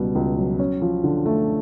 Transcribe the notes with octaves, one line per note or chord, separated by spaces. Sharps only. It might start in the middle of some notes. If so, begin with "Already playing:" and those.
Already playing: C#2 B2 G3
C#2
F#3
C#4
F3
D3
A3